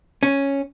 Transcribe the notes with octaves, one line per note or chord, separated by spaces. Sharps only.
C#4